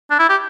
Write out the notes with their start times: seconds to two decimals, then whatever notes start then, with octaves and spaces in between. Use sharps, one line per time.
0.10 D4
0.19 E4
0.29 G4